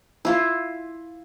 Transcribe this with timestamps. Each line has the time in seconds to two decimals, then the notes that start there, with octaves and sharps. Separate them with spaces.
0.25 E4 F4